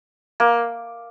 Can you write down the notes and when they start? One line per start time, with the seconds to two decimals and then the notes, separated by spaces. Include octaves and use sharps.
0.40 A#3